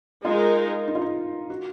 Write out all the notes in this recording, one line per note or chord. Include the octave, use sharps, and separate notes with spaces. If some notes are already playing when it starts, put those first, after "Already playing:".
G#3 D#4 F4 A#4
D#4
F4
D#4
F#4